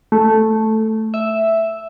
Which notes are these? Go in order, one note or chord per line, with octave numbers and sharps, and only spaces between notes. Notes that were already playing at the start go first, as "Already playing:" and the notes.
A3
E5